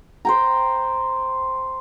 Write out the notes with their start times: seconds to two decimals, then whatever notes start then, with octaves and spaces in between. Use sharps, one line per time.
0.25 C5 G5 A#5